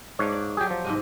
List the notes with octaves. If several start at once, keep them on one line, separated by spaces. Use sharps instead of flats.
G#2 A#3 D4 C#5
D5
F#3 G4 G#4 G5
F3
G#2 C3 G#3